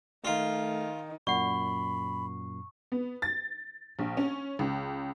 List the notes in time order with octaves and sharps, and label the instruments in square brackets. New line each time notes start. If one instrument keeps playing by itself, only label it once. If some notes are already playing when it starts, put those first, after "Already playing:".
[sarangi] D#3 [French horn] A3 [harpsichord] F4
[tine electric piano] F#2 A#2 C7 [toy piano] D5 F#5 [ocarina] B5 [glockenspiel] C#6
[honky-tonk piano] B3
A6
A#1
C#4
C#2